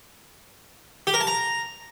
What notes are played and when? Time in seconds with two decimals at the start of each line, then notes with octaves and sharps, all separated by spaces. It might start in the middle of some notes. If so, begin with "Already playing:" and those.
1.07 G4
1.14 A#4
1.21 A5
1.27 A#5